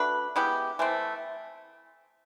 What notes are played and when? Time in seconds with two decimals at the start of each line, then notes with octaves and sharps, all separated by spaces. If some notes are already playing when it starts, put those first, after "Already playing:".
Already playing: A3 D4 F#4 B4
0.36 G#3 B3 E4 G4
0.79 E3 A3 C4